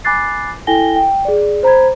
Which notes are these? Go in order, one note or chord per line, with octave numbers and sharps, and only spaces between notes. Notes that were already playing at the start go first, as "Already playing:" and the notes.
G#5 B5 D6 F#6 A6 C7
E4 A4 G5 G#5 A#6 G7
G5
G#4 D5
C5 A#5 B5 G#6